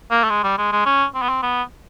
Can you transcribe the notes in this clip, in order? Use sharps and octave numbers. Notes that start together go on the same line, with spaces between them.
A#3
A3
G#3
G3
G#3
G#3
C#4
C4
B3
C4
B3